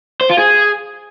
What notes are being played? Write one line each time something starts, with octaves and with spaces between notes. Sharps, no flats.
C5
F4
G#4